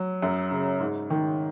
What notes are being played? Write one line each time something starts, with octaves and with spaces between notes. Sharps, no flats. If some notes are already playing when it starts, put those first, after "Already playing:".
Already playing: F#3
F#2
C#3
G#2
D#3